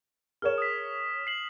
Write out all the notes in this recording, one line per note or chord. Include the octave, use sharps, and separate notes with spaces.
G#4 A#4 C#5 F6 E7
D#6 B6
C7 F#7